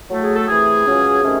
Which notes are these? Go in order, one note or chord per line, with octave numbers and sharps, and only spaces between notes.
A2 F#3 A3
G#4
A4
C3 E3 A3 G#4
C#2 C#3 F#3 C#4
C3 D#3 A3 C#4